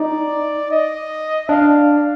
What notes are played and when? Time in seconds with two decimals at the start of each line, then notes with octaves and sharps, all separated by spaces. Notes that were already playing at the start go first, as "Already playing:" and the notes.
Already playing: D#4 D5
0.71 D#5
1.48 D4 F5